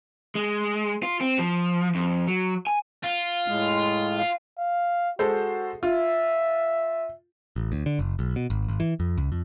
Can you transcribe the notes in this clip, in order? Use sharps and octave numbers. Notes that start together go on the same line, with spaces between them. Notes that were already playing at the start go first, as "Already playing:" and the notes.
G#3
F4
C4
F3
F2
F#3
G#5
F4
A2 G#3
F5
F5
G#3 F#4 A4 C5
F4 E5
A1
D2
D3
F#1
B1
B2
G#1
G#1
E3
F2
C#2
F2